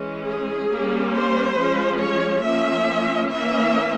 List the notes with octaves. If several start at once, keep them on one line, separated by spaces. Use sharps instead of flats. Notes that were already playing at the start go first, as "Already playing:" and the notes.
Already playing: E3 G#3 C#4
G#4
G3 A#3 C#4
C5
F3 G#3 C#4
C#5
F3 A#3 C#4 E5
E3 A#3 C#4 E5